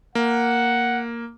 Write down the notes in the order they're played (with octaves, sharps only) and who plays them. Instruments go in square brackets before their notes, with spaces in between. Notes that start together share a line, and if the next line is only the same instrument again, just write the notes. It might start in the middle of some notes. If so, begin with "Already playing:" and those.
[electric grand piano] A#3 [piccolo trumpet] F#5